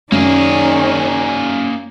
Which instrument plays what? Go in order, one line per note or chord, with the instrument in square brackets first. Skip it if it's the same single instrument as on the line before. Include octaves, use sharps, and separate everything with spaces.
[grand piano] F#2 [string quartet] D#3 C#4 D5 [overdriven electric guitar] A#3 G#4